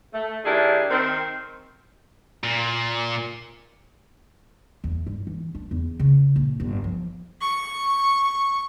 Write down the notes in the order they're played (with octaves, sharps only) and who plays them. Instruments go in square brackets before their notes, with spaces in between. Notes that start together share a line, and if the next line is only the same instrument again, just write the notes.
[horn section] A3
D#3 D4 E4 G4 G#4
D#3 C4
[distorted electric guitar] A#2
[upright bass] E2
G2
E3
D4
E2
C#3
A#1
G1
F3
[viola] C#6